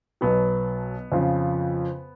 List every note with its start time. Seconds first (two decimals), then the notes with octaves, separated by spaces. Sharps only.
0.21 B1 B2 F#3 B3
1.12 F2 C#3 F3